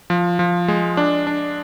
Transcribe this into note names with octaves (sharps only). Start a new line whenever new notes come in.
F3
F3
G#3
D4
D4